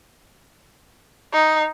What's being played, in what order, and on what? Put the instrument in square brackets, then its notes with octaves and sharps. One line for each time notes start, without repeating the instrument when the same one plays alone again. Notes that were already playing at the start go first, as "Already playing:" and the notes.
[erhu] D#4